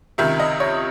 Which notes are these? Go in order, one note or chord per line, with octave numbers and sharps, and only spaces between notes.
C#2 C3 D#3 E5
D#5
C#5